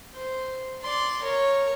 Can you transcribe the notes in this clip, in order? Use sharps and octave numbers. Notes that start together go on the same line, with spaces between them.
C5
D5 C6
A#4 C#5